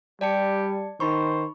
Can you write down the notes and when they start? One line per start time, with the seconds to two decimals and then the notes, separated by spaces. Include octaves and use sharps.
0.21 G3 G4 D5 A5 C#7
1.00 D#3 D#4 C5 B5 C#6